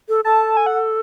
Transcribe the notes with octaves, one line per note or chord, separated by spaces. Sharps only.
A4
A4 A5
G#5
F#5